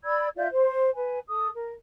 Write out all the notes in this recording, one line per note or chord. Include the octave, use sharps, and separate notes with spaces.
D5 B5 E6 G#6
F4 D5 E5 G6
C5
B4 G#5
A4 D#6
A#4